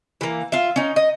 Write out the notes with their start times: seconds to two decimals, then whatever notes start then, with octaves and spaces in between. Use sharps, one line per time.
0.21 E3 A#3
0.52 F4 E5
0.76 C#4 D#4
0.96 D#5